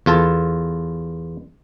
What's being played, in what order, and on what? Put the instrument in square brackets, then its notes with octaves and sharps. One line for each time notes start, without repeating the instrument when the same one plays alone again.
[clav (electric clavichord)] E2 F4 A4 A5